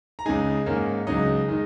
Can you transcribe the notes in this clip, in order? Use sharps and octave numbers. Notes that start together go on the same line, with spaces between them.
A#5
C#2 C#3 G#3 D#4 G#4 G#5
G#2 D#3 A#3 C#4
C#2 C#3 F#3 D#4 D#5
D#3 G#3 D#4